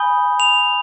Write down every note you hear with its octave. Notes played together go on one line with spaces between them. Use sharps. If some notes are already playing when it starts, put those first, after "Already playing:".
Already playing: G#5 B5 D#6 G6 G7
F7